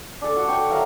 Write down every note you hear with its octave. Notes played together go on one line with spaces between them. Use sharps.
D4 A4
F#4
C#5 F#5 G5 C#6
F#3 A#4 E5 F5